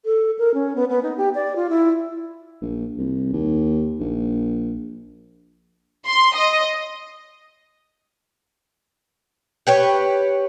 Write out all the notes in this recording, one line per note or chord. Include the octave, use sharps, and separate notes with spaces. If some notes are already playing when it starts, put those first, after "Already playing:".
A4
A#4
C#4
B3
B3
D#4
G4
D5
F4
E4
A#1
C2
D#2
A#1
C6
D#5
G4 B4 C#5